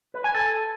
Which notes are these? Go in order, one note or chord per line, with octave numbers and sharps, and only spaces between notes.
B4
G#5
A4